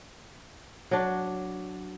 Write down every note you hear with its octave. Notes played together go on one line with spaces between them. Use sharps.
F#3 D4